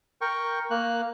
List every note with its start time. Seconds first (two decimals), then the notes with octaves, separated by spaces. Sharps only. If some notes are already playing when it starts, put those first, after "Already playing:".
0.21 A#4 G5 C#6
0.71 A#3 F#6